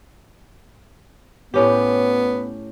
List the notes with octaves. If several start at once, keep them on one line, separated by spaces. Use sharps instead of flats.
A2 B3 C#4 G4